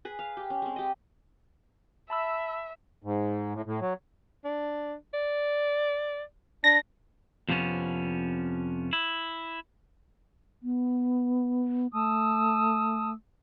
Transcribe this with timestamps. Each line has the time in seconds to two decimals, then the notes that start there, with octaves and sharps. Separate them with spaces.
0.05 G#4 B4
0.19 F5
0.37 G4
0.50 C#4
0.62 G#3 C4
0.76 G4 D#5
2.10 E5 A5 B5 E6
3.04 G#2
3.54 A2
3.66 A2
3.81 F#3
4.44 D4
5.14 D5
6.64 D4 A#6
7.49 F2 C3 F3 B3 C#4
8.93 E4
10.63 B3
11.93 A3 A5 D#6 E6